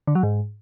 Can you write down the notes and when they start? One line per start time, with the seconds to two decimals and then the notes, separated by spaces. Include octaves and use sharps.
0.07 D3
0.15 F#3
0.23 G#2